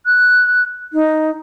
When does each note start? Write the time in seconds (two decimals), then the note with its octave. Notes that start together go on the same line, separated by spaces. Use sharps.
0.06 F#6
0.93 D#4